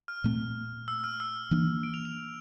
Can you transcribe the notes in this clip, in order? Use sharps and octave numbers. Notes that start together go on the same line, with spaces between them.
F6
A#2 A3 C4
E6
F6
E6
E3 A#3 D4
D7
F7
F7